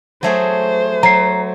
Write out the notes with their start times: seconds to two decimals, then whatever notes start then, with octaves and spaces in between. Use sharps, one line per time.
0.23 F#3 A3 G#4 C5
1.03 F#3 A#5 C7